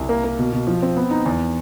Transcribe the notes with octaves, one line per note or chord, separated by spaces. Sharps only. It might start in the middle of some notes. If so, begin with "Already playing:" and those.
Already playing: C2
A#3
A#3
B2
B2
F3
C4
B3
D#4
E2